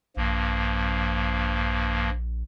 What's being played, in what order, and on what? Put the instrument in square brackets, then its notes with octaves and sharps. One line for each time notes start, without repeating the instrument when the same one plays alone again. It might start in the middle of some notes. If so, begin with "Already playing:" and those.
[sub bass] A#1 [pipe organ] G2 F3 A#3